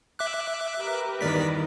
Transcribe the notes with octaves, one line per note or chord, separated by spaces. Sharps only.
E5 D6 F#6
G4 A#4 B4
E2 G2 D#3 D5 B6